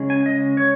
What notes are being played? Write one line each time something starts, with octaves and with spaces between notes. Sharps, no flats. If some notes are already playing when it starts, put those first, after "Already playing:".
Already playing: C#3 G#3 C#4
G#5
D#5
C#5